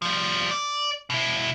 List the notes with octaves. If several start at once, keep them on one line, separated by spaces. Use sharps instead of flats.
F3 G3
D5
B2 E4